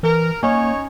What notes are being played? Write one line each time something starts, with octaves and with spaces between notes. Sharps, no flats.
E3 A#4
A#3 C#4 D#4 C#5